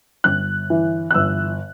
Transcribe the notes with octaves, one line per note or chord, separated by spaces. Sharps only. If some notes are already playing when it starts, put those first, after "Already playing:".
G1 F#6
E3
F#6
G1 E6